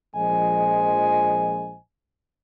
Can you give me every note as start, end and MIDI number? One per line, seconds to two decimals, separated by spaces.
0.15 1.76 34
0.15 1.76 53
0.15 1.76 56
0.15 1.76 72
0.15 1.76 75
0.15 1.76 80